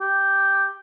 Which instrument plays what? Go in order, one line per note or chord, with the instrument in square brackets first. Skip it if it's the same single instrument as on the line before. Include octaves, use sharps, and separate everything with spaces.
[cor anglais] G4